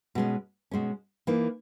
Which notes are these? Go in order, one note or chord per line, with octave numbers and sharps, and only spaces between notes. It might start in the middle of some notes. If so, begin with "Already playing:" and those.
B2 G#3 C#4
B2 G#3 C#4
E3 A#3 D#4